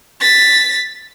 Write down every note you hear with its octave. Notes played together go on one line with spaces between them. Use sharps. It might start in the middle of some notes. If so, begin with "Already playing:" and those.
A6 B6